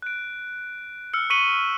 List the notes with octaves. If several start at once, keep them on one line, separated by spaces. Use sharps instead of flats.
F#6 D7
E6 F6 C#7
C#6 B6 C#7 D#7 F#7 G7